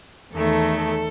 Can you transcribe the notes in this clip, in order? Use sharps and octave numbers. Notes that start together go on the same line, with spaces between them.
E2 D#3 A3 A4